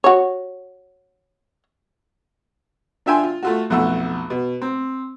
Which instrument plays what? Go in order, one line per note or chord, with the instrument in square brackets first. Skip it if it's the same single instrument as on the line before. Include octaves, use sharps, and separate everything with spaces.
[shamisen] F#4 C#5
[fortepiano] D4 F4 E5 G5 G#5 C6
F4
A3 F4 F#4
B1 F2 A3 F#5 E6
B2
C4